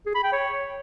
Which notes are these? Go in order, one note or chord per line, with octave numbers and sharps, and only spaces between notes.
G#4
B5
G5
C#5